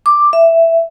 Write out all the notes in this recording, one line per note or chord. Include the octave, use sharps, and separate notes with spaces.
D6
E5